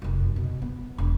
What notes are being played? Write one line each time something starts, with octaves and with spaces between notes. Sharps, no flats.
F1 F#2
B2
B3
E1